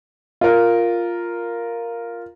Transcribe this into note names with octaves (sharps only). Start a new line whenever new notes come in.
F4 A#4